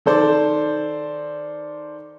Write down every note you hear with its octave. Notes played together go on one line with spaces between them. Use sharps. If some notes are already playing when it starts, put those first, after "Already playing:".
D#3 A4 C5 D5